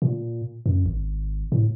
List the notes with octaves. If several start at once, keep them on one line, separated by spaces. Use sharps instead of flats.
A#2
F#2
G#1
A2